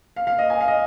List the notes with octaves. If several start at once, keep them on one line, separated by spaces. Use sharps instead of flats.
F5
F5
D#5
G#5
F5
D#5